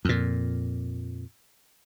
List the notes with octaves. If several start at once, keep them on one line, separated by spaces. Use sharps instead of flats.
F2 A#2